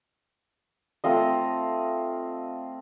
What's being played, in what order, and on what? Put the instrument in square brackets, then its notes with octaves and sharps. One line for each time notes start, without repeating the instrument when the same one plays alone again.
[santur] A3 C4 F4 D#5